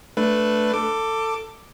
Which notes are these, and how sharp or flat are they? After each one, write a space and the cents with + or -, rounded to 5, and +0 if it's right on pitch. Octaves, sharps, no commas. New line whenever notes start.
A3 +0 D4 +0 B4 +0
A4 +20 D6 +0